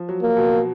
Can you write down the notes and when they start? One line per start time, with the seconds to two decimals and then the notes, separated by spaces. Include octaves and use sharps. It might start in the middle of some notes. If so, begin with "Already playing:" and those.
Already playing: F3
0.09 F#3
0.22 A#3
0.37 B2